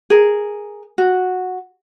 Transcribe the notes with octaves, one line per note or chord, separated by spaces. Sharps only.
G#4 A#4
F#4